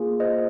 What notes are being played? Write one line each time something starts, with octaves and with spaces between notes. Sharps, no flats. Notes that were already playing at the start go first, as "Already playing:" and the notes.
Already playing: A#3 F4 G#4
C5 D#5